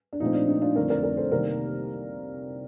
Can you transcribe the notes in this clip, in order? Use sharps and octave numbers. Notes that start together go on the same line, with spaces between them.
D4
A#2 F3 A3 C4 D#4
D4
D#4
D4 F4
F2 D3 F3 A3 A#4 D5
A#4 D5
A#4 D5
A4 C5
C2 C3 D#3 A#3 A#4 D5